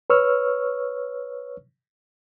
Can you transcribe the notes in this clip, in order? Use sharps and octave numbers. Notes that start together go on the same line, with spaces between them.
B4 C#5 C#6 E6 F6